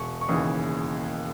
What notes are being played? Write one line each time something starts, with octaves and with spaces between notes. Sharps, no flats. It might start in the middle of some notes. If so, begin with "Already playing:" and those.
Already playing: E1 C#6
C#6
D#2 C#3 E3 D#6